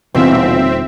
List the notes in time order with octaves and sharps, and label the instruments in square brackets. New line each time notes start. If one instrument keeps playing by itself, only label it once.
[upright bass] D#1 D3 [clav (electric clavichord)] B2 E3 F4 [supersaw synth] C4 E5